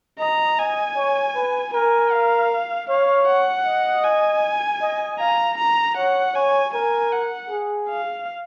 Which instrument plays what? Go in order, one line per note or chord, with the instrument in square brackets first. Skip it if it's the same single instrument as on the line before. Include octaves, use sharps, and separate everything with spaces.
[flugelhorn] D#5 [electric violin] A#5
[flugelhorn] D#5 [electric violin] G#5
[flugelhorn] C#5
B4
[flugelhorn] A#4 [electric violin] G#5
[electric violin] F5
[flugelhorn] C#5 [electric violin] F5
[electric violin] F#5
[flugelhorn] D#5
[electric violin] G#5
[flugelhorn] D#5
[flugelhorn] F5 [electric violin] A#5
[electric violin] A#5
[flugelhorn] C#5 [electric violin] F#5
[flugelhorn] C#5 [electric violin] G#5
[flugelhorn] A#4 [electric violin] G#5
[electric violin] F#5
[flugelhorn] G#4
[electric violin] F5